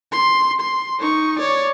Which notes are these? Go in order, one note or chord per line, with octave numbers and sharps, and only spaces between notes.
C6
C6
D#4 C#6
C#5 D5